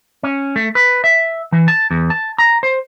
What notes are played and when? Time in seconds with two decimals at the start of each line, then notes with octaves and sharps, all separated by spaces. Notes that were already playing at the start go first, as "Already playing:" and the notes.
0.23 C#4
0.56 A3
0.75 B4
1.04 E5
1.52 E3
1.68 A5
1.91 E2
2.10 A5
2.38 A#5
2.63 C5